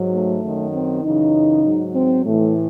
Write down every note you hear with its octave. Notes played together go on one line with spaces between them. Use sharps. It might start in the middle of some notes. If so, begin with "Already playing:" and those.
Already playing: G#2 F#3
A3
F#2 D#3 F#3
C4
F#2 C#3 E3 D#4
G#2 F#3
C4
A2 E3 A3